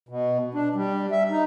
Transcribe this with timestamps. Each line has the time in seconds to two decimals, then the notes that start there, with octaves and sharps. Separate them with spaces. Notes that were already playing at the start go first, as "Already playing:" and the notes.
0.09 B2
0.54 D4
0.75 G3
1.12 E5
1.31 D#4